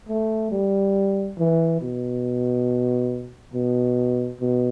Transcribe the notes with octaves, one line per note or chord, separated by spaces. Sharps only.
A3
G3
E3
B2
B2
B2